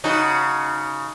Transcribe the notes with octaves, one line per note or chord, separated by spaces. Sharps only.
C#3 D#4 F#4